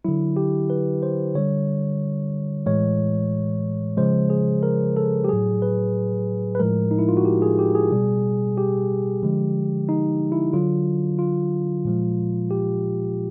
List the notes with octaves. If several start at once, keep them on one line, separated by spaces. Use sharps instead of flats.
D3 F#3 E4
G4
B4
C5
D3 G3 C#5
A2 E3 G#3 C#5
C#3 F3 G#3 C5
G#4
A#4
A4
G4
A2 F#3 G#4
B4
B4
A2 F3 G#3 A#4
D#4
E4
F4
F#4
G4
G#4
G4
G#4
B2 G3
G4
D3 F3 G#3
D#4
E4
D3 F#3 F4
F4
A#2 F3 G#3
G4